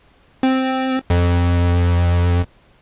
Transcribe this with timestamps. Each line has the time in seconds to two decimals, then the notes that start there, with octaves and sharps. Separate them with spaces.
0.43 C4
1.10 F2